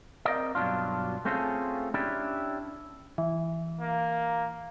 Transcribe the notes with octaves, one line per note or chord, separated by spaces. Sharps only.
C4 A#4 D5 D#5
G2 B2 F#3 D4 F4
A3 C4 C#4 F4 G#4 A4
C#4 D4 E4 G4
E3
A#3